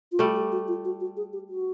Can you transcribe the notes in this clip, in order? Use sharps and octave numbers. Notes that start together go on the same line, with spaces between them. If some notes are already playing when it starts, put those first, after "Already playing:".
F4
G3 A3 F#4
G4
F#4
F4
F#4
F#4
G#4
G4
F#4